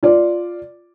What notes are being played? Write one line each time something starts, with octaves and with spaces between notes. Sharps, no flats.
F4 D5